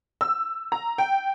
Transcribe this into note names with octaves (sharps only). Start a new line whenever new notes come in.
E6
A#5
G5